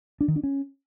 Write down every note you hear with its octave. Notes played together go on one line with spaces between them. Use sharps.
D4
D#3
D4
C#4